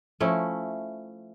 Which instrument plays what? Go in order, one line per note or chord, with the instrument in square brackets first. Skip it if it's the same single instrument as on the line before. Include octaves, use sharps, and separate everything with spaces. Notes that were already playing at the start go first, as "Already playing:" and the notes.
[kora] F3 A3 C#4 E4